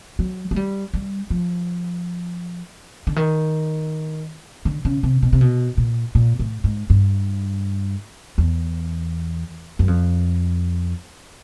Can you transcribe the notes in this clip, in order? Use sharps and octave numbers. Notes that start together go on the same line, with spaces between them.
F#3
G#3
G3
G3
F3
D3
D#3
D3
C#3
C3
B2
C3
B2
A#2
A#2
A2
G#2
G2
E2
F#2
F2